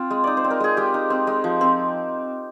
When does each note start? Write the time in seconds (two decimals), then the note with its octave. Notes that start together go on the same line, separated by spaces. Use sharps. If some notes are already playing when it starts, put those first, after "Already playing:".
Already playing: C4 F4
0.11 G#3
0.24 D#4 D5
0.37 C5
0.44 C4
0.51 A#4
0.60 G#3 G#4
0.77 G#3 G4
0.94 D#4
1.10 C4
1.27 G#3
1.44 F3
1.61 C4